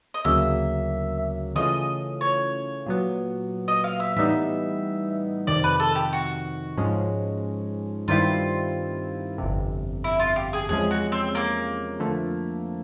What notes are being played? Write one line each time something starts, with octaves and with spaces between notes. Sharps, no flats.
D#5
D2 C#3 F#3 A#3 E5
C#3 E3 A3 C#4 F4 D#5
C#5
A#2 F#3 B3
D#5
F5
E5
A2 E3 G3 B3 D#4 E5
F2 C3 D#3 D5
B4
A4
G4
F#4
G#2 F3 G#3 C#4
G2 D#3 G3 C4 E4 F4
G1 F2 C3
E4
F4
G4
G#4
E2 C3 F3 G#3 C#4 G#4
F#4
C4
A#3
F2 D3 F3 A3